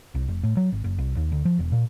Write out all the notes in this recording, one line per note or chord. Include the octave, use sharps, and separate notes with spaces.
C2
F1
A2
F#3
G#1
F#1
C2
D#2
D2
F3
E1
A#2